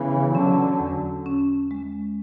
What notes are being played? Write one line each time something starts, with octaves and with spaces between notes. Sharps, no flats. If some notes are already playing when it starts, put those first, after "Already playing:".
Already playing: C#3 E3 B3
D3 F#3 C#4
E2
C#4
G#3